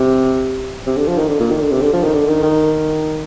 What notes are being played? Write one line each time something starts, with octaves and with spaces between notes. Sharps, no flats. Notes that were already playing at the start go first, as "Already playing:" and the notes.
Already playing: C3
C3
D3
F3
D#3
D3
A#2
D#3
D3
C3
D3
F3
D#3
D3
D#3
D#3